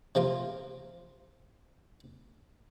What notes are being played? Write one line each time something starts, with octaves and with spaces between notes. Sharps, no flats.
C3 F3 A#3 F4